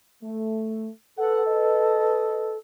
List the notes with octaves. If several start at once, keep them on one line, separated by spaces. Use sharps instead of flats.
A3
A4 B4 F#5
B4 D#5